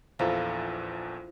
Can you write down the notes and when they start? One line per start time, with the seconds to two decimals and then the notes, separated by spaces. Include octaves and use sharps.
0.19 A#1 E2 F3 E4 A4 A#5